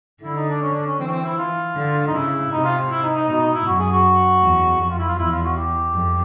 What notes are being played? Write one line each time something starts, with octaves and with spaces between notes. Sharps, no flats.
D3 E4
D#4
D4
C#4
D4
C#4
E3 C4
C#4
C4
E4
F4
D3
D#4
C#3 E4
C3 D#4
F4
E4
D#4
D#4
B2 D#4
D#4
E4
F#2 F#4
G#4
F#4
E2
F2 F#4
F4
E4
F4
E2 E4
F4
F#4
G4
F2